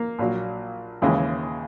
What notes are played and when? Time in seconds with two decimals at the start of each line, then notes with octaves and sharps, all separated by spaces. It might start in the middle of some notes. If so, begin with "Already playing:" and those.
Already playing: A#3
0.19 A#1 A#2 F#3
1.02 D#2 C#3 E3 G#3